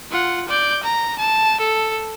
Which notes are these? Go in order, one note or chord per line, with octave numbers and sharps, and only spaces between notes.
F4 F#5
D5 G6
A#5
A5
A4